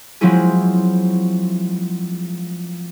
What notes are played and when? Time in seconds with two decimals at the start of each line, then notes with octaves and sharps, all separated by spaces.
0.21 F3 F#3 G#3 C4 E4 G#4